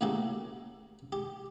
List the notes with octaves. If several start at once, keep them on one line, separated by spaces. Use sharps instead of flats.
A2 C#3 A#3 F#4 G4 A4
G4